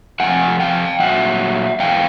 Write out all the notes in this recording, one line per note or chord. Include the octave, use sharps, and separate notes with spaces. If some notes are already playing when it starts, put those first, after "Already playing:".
F2 C3 F3 F#5 G#5
F5 G5
A#2 F#3 E5 F#5
G#2 E3 F5 G5